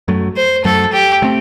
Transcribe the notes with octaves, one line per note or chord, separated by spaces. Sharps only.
F#2 F#3 A3
C5
F#2 F#3 A3 A4
G4
F#3 A3 C4